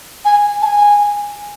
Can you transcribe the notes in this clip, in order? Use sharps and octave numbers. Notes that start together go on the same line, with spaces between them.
G#5
A5
G#5